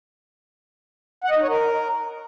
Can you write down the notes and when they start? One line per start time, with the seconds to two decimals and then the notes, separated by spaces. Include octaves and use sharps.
1.24 F#5
1.30 D#5
1.36 D#4
1.42 C#5
1.49 A#4